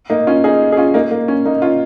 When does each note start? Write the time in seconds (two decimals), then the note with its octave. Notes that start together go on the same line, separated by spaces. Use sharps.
0.10 A#3 D#4
0.27 C#4 F4
0.44 D#4 G#4
0.72 G#4
0.77 C#4 F4
0.94 A#3 D#4
1.11 A#3
1.28 C#4
1.45 A#3 D#4
1.62 C#4 F4